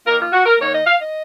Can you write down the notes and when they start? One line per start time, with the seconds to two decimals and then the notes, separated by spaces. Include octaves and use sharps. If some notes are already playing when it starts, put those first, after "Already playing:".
0.06 D#3 A#3 F4 A#4
0.19 F4
0.32 F#4
0.46 A#4
0.60 D#3 A#3 D#4 C#5
0.72 D#5
0.86 F5
1.00 D#5